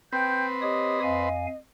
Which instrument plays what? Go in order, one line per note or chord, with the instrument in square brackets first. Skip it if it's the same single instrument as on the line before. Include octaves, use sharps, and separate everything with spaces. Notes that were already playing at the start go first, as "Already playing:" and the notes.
[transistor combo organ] C4 B4 [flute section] G5 G6
[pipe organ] G4 C#5 D#6 [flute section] D#5
[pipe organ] F2 F5 G#5